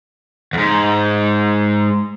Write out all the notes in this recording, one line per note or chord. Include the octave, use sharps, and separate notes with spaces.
E2 G#2